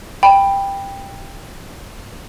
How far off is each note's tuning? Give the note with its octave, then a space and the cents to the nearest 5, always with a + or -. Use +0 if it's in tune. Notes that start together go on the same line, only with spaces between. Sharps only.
G5 +10 B5 +0